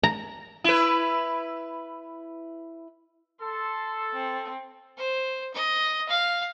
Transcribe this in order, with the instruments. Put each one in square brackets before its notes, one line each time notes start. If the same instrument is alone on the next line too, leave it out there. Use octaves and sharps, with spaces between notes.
[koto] A#5
[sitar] E4 B4
[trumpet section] A4 [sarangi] C6
[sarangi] C4
[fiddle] C5
D#5
F5